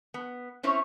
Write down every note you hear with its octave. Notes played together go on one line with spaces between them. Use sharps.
B3
C4 C#4 E4 C5 C#5